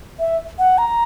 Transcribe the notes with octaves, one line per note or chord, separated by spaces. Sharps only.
E5
F#5
A#5